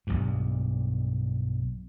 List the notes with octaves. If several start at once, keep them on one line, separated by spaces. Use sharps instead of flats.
B1 G2